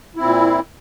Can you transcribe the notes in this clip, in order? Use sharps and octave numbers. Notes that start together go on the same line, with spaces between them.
A#2 C4 E4